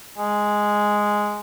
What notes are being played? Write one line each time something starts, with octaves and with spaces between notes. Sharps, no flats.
G#3